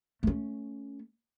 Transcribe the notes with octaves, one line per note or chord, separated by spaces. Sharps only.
A3 C#4